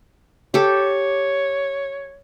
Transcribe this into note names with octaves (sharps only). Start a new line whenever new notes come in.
G4 A4 C#5